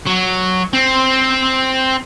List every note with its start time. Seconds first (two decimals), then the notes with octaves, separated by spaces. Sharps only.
0.06 F#3
0.73 C4